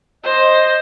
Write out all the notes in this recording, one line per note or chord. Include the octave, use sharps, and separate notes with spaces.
C5 D#5